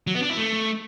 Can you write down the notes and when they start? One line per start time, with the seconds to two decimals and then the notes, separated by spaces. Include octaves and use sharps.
0.07 F#3
0.15 B3
0.22 D4
0.30 E4
0.37 A3